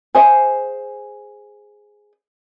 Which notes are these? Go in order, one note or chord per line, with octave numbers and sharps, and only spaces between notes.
G#4 C5 E5